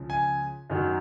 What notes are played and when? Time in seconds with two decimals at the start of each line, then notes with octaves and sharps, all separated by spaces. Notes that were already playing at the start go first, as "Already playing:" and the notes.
Already playing: C#2 C#3 F3
0.10 G#5
0.70 F#2 D#3 F#3